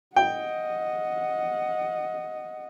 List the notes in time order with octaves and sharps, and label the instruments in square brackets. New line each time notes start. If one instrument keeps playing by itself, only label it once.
[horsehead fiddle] D#5 F#5 [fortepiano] G5